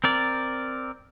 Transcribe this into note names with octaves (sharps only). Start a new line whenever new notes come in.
C4 A#4 D5